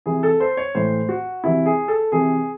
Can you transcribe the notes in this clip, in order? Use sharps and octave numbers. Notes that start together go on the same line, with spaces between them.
C3 E3 G#4
A4
C5
C#5
A2 E3 C5
F#4
C3 E3 E4
G#4
A4
C3 E3 G#4